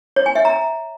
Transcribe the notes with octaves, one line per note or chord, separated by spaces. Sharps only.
C#5
G#5
E5
A#5